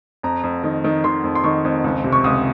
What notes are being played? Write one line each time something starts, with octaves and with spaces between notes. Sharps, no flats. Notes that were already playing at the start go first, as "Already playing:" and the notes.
F2 A#5
F2
D#3
D#3
D#3 C6
F2
C6
D#3 C#6
F2
C#2
C3
C#6
C#2 D#6